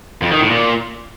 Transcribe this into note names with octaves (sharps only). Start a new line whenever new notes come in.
F2
D#3
A2
A#2